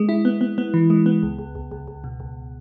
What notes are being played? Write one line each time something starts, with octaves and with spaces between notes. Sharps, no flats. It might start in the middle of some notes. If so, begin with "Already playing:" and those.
Already playing: G#3
E4
B3
B3
B3
E3
G#3
B3
C#2
C#2
C#2
C#2
C#2
B2
C#2